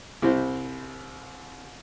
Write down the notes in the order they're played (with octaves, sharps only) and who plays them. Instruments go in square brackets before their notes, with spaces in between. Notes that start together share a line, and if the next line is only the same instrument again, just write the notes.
[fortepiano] C2 C3 E4 C5